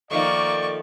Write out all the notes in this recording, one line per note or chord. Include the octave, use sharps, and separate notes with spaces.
D#3 F3 A3 A#3 D5 C#6